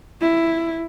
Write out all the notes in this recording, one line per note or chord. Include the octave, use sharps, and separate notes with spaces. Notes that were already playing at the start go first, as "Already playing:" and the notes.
E4